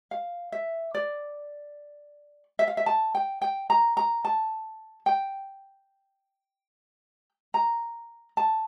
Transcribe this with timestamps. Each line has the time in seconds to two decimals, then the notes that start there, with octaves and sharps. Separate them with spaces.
0.11 F5
0.52 E5
0.95 D5
2.59 E5
2.68 F5
2.77 E5
2.86 A5
3.15 G5
3.42 G5
3.70 A#5
3.97 A#5
4.25 A5
5.06 G5
7.54 A#5
8.37 A5